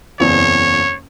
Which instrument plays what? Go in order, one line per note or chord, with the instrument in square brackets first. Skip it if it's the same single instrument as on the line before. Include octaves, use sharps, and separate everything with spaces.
[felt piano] F#1 E2 C4 [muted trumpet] C#5